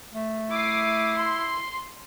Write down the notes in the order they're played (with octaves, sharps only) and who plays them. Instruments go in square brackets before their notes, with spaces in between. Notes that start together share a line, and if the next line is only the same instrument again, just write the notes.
[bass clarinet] A3
[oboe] E4 [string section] D6 D#6 C7
[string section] C6